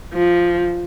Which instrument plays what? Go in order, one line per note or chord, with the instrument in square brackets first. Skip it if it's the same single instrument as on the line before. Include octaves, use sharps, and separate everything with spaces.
[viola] F3